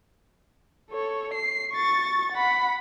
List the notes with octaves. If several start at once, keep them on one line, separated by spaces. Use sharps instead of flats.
A4 C#5
C7
C#6 A6
F#5 B5